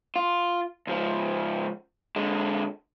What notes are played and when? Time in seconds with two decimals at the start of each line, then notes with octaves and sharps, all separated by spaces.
0.16 F4
0.87 C#2 F3
2.16 D3 G#3